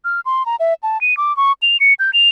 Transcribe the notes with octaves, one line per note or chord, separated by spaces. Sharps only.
F6
C6
A#5
E5
A5
D#7
D6
C#6
F7
C#7
G6
F7